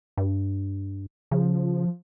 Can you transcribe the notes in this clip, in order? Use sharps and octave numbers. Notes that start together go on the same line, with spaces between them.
G2
C#3 F3